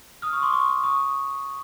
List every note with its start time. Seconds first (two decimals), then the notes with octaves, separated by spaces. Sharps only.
0.22 D#6 F6
0.33 C#6 D#6
0.42 C6 D6
0.53 C#6 D#6
0.84 C#6 D#6